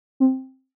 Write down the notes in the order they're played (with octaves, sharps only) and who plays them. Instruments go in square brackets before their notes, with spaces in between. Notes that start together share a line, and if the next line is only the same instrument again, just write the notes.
[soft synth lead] C4